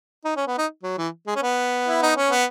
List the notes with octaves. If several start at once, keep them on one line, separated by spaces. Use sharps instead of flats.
D#4
C#4
B3
D#4
F#3
E3
G#3
C#4
B3
E4
D#4
C#4
B3